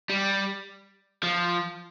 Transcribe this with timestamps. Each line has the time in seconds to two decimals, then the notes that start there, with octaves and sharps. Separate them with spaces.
0.10 G3
1.23 F3